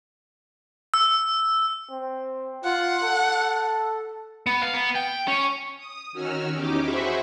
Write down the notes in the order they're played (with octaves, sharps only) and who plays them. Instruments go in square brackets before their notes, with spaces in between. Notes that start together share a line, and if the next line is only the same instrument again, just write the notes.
[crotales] E6
[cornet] C4
[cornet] F4 [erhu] F#5
[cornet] A4
[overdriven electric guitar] B3
F5
B3
G5
C#4
[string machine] D#6
D#3 C#4 F#4 E6 F6
E2 C#4 D#4 G4 D6
F#4 G#4 C5 E5 B5 C#6